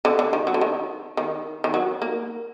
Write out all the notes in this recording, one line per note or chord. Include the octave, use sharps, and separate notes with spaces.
D3
D3
D#3
F#3
D3
D#3
D#3
D#3
F#3
A#3